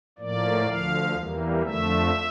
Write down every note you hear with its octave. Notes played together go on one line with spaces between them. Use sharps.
A2 F3 A#3 D5
D2 D3 F3 F5
E2 E3 G3 A#3
F2 D3 F3 A3 E5